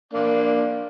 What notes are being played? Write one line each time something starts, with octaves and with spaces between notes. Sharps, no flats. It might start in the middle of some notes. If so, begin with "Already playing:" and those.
A#3 D4